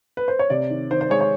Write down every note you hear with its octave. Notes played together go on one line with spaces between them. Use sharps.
B4
C5
C#5
C3 D5
D#3
D#3 C5
C5
G#3 C#5
C#5